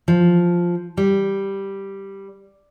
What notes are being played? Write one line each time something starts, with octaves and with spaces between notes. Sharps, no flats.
F3
G3